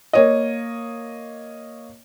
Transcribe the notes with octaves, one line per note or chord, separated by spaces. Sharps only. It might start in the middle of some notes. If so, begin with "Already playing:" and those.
A#3 C#5 D#5